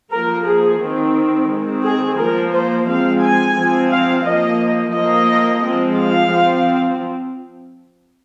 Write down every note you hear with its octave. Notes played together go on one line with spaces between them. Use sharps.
F3 A#3 A#4
G#4
D#3 C4
D#3 G#3 C4
G#4
F3 A#3 A#4
C5
F3 G#3 C4 F5
G#5
F3 C4
F5
F3 A#3 D#5
F3 A#3 D#5
F3 G#3 C4
F5
F3 C4